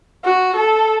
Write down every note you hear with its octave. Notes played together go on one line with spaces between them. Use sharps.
F#4
A4